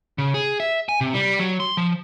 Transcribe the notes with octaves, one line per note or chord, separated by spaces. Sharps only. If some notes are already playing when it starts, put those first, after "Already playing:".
C#3
G#4
E5
G#5
C3
G3
F#3
C6
F3